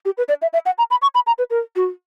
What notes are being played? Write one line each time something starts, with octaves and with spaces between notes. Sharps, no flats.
G4
B4
D5
E5
E5
F#5
A#5
B5
C#6
B5
A#5
B4
A#4
F#4